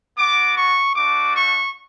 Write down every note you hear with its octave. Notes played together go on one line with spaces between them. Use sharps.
B3 F#4 D6
C#6
A3 D4 F#4 D6
C#6